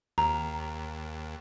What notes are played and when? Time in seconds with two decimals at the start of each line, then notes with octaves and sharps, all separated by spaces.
0.18 D#2 A#5